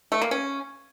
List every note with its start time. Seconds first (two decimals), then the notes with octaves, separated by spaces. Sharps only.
0.12 A3
0.21 A#3
0.31 C#4